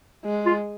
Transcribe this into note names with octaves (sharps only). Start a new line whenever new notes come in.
G#3
F4